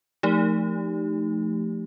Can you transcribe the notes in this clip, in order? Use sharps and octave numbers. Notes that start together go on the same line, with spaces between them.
F3 A3 D#4 G4